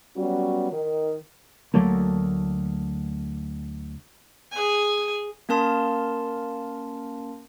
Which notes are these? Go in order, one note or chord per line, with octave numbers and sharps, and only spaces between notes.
F#3 G3 B3 C#4 F#4
D#3
D2 F#3 A3 A#3
G#4 G#5
A#3 C#4 A#4 A5 C6